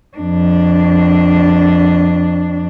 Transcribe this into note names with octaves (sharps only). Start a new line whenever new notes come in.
F2 D4